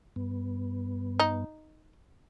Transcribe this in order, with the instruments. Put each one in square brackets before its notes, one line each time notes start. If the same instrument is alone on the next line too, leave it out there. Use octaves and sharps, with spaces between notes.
[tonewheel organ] G2 B3
[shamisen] D#4